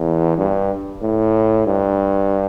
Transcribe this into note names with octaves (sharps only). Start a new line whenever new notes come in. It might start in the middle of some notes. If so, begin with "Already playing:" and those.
Already playing: E2
G2
A2
G2